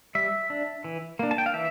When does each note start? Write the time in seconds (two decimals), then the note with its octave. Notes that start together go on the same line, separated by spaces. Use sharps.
0.15 G3 E5
0.50 D4
0.84 E3
1.19 A#3 D4
1.31 A5
1.38 G5
1.46 F5
1.53 E3 E5